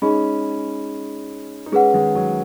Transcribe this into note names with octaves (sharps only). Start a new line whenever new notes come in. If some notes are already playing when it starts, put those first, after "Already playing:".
G#3 C#4 D#4 G#4 D#5 B5
D#4
G#3 C#4 G#4 B4 F#5
D#3 G#3
F#3